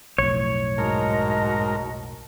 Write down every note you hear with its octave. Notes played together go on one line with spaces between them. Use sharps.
B1 F2 A2 C#5
G#2 F#4 A#4 D#5 A5